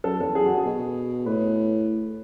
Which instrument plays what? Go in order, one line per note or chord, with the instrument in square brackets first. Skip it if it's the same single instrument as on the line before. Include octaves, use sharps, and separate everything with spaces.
[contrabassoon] F#2 [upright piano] A4
[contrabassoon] E2 [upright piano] A4
[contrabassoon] F#2 [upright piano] G#4
[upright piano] F#4
G#4
[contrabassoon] B2
[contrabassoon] A2 [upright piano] B4